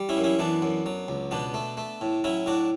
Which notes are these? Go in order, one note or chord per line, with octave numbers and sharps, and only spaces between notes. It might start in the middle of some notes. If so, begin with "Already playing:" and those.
Already playing: G3
C#4 E4
F#2
C#4 E4
E3 B3 D4
F#2
F#3
C#2
B2 B3 D4
A3
A3
A2
F#3 C#4 E4
A2 D4 F#4